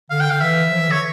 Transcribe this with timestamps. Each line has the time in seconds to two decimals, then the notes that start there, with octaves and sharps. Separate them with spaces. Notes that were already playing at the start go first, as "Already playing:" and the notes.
0.10 D3 F5
0.21 G5
0.30 D3 F5
0.41 E3 E5
0.71 F3
0.80 E3
0.88 D3 C#5
0.98 E3